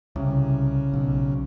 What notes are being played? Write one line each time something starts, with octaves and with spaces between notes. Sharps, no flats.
C2 C#3
B1